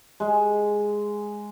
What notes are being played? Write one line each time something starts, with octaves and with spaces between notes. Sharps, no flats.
G#3